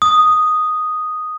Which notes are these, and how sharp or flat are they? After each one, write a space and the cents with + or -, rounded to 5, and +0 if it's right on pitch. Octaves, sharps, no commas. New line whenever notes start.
D#6 +0